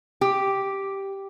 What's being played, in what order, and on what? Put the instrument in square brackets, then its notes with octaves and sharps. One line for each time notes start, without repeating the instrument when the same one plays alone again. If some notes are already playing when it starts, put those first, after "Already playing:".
[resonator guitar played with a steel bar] G4